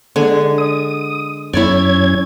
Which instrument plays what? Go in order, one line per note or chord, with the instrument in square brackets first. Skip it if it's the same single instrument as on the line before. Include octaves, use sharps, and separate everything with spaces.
[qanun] D3 G#3 G#5 [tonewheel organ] D4
[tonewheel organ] D#6
[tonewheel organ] F#2 C#4 G#6 [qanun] E4 C#5 D5